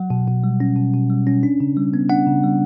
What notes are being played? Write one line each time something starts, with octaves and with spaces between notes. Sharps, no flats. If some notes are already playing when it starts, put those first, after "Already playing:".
Already playing: F#3 F#5
B2
B2
G3
C#4
B2
B2
G3
C#4
D4
C#3
G3
B3
D4 F#5
C#3
G3